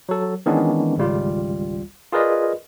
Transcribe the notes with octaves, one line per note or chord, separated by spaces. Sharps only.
F#3 A4
D#3 E3 G#3 B3 C#4 D4
G#1 C#2 G3 F4
F4 G#4 A#4 B4 D5 D#5